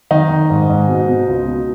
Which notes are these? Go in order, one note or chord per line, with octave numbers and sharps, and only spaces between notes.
D#3 D#4
D#3
G#2
G#2
B2
B2
C#2
B2